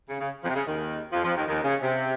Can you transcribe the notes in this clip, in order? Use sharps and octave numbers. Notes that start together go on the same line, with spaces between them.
C#3
C#3
F2 F3
C3
C#3
D#2 D#3
F2 F3
F2 F3
D#2 D#3
D#2 D#3
C#3
C3